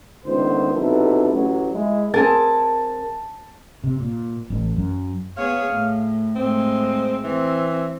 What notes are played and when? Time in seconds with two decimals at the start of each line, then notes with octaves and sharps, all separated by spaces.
0.25 C#2 D3 D#3 A3 B3 C5
0.73 B1 C3 E4 A4
1.30 A1 F#3
1.73 G#3 E4
2.14 C4 G#4 A#4 A5
3.84 C3
4.00 A#2
4.50 A1
4.76 F#2
5.37 B3 G#4 C#5 F5
5.70 A2
6.35 A2 G#3 C4
7.24 E3 C4